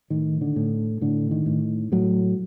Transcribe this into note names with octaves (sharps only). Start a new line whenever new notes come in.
A2 D#3
D3
A2
A2 D3
D#3
A2
A2 F#3